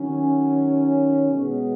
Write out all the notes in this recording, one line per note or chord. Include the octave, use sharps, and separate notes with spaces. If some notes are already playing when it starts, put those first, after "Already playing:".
Already playing: D#3 F#3 C#4
B2 G#3 B3